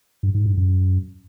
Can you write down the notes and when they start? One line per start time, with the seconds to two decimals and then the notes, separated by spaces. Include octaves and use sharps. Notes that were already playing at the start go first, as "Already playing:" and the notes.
0.23 G2
0.34 G#2
0.46 G2
0.57 F#2